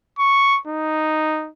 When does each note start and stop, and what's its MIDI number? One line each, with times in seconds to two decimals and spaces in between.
0.19 0.59 85
0.67 1.49 63